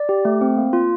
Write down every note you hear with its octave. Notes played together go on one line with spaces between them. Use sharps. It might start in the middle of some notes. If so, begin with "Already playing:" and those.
Already playing: D5
G4
A3
C4
A#3
F4